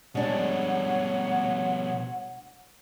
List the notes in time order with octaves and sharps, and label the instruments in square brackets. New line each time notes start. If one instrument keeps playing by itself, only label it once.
[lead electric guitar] B2 G3 [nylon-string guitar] G#3 D4 [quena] C#5 [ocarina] F#5